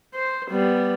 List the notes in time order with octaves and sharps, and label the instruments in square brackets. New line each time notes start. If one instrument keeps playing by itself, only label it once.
[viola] C5
G3 B3